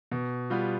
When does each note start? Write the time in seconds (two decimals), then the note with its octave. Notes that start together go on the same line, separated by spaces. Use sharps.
0.12 B2
0.50 G3 B3 F4